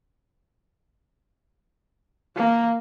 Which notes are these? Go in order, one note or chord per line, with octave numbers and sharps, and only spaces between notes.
A#3